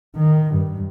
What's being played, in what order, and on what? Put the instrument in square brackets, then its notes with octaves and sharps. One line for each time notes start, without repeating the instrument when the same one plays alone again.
[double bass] D#3
G2